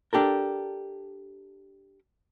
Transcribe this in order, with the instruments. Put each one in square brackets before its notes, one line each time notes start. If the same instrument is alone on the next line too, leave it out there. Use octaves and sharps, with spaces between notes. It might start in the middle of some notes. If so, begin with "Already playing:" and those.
[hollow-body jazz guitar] D4 G4 A4 A#4